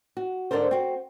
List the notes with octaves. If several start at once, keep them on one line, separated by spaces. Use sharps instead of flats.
F#4
G#2 D3 D4 A4 A#4 C5
C4 F#4